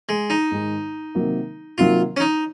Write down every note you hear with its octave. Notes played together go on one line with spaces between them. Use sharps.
G#3
D#4
G#2 D#3 G#3
C3 D#3 F#3 A#3
C3 D#3 F#3 A#3 F4
C#4
D#4